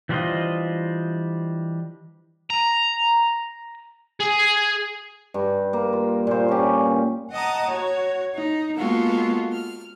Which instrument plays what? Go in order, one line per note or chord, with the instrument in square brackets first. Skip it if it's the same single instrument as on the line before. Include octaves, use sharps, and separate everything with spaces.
[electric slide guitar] E3 G3 D4 F4 C5 D#5
[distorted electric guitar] A#5
G#4
[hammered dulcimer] G2
A#3
F4
A#2 C5
C#4 G4
[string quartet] D#5 F#5 A5 A#5 D#6
F#4 C#5
D#4
G#3 A#3 B3 F4 F#4 A4
F6